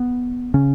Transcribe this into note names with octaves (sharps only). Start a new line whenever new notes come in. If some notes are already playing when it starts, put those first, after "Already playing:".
Already playing: B3
C#3 C#4